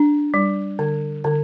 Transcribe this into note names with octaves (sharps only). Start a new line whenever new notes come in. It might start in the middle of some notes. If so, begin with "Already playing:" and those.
Already playing: D4
G3
D3
D3